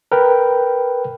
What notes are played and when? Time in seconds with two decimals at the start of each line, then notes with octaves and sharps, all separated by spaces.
0.12 A#4 B4 G5